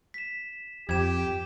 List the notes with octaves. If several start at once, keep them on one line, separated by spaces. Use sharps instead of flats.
B6 E7
F2 G4 G#6 E7